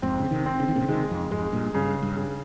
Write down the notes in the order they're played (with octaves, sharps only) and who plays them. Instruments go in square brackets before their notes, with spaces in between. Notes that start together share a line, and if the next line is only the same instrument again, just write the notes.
[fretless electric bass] F2 G#2 [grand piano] C4
[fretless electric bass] C#3
C3 D#3
[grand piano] C4
[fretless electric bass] C#3
D#3
A#2 C#3
[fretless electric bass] C3 D#3 [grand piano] G#3
[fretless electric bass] F2
[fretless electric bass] F2 G#2 [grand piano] G#3
[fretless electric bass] G2 A#2
[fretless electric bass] G2 [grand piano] C#3
[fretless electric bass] G2
[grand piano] C#3